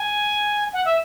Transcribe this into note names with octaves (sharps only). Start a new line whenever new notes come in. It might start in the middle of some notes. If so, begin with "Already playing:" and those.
Already playing: G#5
F#5
E5